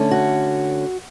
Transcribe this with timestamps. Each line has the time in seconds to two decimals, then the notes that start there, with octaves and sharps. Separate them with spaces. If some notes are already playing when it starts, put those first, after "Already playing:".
Already playing: D3 A3 C#4
0.11 F#4